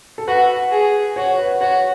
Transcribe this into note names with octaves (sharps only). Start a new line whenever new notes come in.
A4
F#4 B4
G#4
F#4 C#5
B4
F#4 C#5